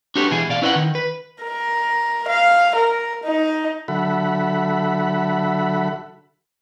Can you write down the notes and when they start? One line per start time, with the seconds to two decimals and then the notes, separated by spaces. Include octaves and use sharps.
0.16 D4 F#4 G4 A4 B4 C#5
0.31 B2 E3 E4 G#4
0.49 B2 D5 F5
0.62 C#4 E4 B4 C5 D#5 F#5
0.76 D#3
0.95 B4
1.44 A#4
2.28 F5
2.75 A#4
3.24 D#4
3.88 D3 F#3 A4 E5 F#5 B5